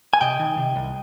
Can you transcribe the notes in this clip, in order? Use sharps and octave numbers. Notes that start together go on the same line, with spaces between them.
G#5
C3 D#5 G5
D#3
C3
C2